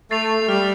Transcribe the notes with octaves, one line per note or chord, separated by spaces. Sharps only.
A3 A6 C7 F7
A3
G3 F6